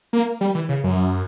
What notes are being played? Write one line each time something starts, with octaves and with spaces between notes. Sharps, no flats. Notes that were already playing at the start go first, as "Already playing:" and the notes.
A#3
G3
E3
C#3
F#2